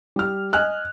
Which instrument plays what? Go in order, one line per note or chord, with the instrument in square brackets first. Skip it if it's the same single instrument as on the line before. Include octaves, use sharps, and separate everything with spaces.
[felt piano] G3 F6
D#5 G#5 F6 F#6